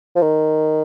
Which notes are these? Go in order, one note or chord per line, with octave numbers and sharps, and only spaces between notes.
F3
D#3